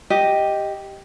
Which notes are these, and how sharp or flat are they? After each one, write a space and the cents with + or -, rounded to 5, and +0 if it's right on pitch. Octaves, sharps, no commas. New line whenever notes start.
G4 +0 D#5 +0